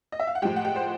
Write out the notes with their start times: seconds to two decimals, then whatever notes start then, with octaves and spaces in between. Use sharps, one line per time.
0.12 D#5
0.20 E5
0.27 F5
0.35 F#5
0.42 A2 F3 G#3 G4 G5
0.56 F#5
0.65 G4 G5
0.76 C5